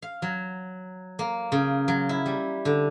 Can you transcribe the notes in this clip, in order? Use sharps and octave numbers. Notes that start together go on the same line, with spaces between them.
F5
F#3
A#3
C#3
F#3
E4
G3
D3